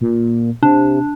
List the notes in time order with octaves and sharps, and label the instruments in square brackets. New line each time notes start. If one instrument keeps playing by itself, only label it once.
[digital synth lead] A#2
[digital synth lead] C3 [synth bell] D4